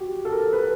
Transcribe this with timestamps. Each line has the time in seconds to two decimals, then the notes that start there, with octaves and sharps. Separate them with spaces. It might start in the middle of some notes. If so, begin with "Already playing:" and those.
Already playing: F#4 G4
0.25 A4
0.32 A#4
0.53 B4